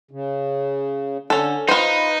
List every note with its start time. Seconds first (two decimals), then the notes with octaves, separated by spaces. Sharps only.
0.11 C#3
1.30 D3 C#4 A4
1.68 D#4 F4 B4 C5